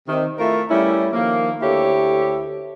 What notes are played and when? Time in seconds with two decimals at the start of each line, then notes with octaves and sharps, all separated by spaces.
0.08 C3 D#3
0.39 A3 E4 F4 A#4
0.70 G3 A3 C#4 E4
1.13 D#3 F3 A#3
1.61 D2 E4 G4 A4 C#5